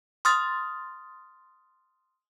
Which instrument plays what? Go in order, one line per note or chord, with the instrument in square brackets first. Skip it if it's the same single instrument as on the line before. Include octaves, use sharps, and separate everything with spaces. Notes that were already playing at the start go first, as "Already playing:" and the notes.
[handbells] C6 D#6 F6 A6